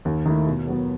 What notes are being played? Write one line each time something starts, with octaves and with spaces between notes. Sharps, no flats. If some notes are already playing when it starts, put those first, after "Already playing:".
D#2
D#3 A3 E4
B2
F#3 B3